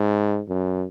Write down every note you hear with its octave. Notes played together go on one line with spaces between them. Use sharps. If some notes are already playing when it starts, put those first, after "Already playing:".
Already playing: G#2
F#2